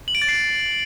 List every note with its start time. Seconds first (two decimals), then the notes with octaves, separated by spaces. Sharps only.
0.08 F#7
0.15 D7
0.22 A6
0.28 C7